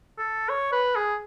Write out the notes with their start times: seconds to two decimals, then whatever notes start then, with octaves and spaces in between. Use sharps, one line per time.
0.18 A4
0.49 C#5
0.72 B4
0.96 G#4